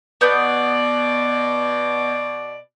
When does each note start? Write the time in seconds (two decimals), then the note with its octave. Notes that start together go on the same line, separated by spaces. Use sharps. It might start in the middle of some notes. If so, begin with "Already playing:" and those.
0.21 B2 B3 D5 G6